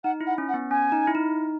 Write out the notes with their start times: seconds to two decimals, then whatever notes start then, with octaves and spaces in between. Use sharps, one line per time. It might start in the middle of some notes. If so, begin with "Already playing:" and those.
0.04 D#4 F#5
0.21 E4
0.27 F#5
0.38 C#4
0.49 F#5
0.54 B3
0.71 C#4 G#5
0.92 D#4
1.07 E4
1.15 D#4